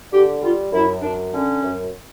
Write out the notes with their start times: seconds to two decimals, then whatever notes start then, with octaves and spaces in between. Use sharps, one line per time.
0.12 D3 G4
0.42 G3 F4
0.73 F#2 E4
1.02 F#2 D4
1.33 D3 C#4
1.63 F#2